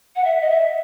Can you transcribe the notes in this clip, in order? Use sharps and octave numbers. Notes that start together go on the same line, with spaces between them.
F#5
E5
D#5
E5